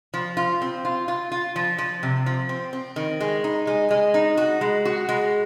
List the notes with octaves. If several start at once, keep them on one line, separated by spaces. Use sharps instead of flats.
F3
F4
C4
F4
F4
F4
F3
F3
C3
F3
C4
C4
D#3
G#3
D#4
G#3
G#3
D#4
F#4
G#3
F#4
G#3